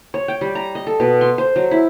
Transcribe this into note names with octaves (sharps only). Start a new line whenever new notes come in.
C#5
G5
G3
A#5
D#5
A4
B2
C6
C5
F#3
E4